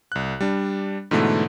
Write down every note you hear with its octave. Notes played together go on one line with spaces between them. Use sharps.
C2 F#6
G3 D4
G#2 B2 D3 E3 A3